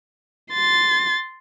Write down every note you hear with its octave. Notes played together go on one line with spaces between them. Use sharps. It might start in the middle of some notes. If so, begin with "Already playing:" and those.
C6 A6